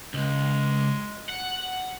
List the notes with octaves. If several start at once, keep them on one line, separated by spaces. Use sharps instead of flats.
C#2 G#3
F#5